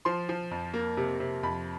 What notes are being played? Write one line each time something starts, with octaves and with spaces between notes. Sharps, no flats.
F3 C6
F3
F2
A#3
C3
C3
F2 B5